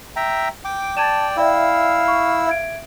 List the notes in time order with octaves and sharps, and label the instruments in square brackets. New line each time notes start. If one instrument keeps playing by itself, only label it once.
[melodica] E5 G5 A#5
G5 D6
[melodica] D5 G5 [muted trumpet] A5 [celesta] G#6 D#7 E7
[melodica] E4 E6 [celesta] D5 E5 G5 [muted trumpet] F5
[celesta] C#6
E5 G#6 D7